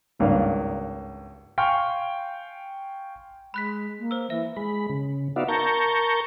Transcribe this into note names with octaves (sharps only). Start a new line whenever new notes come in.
G#1 C#2 G2 A#3 D4 F5
F5 G5 G#5 C6 C#6 F6
G#3 B5 F#6 B6
A#3
C5 E6
E3 E5
G#3 B5
C#3
B3 D#4 F#4 D5 E5 F5
A#4 A5 A#5 C#6 G6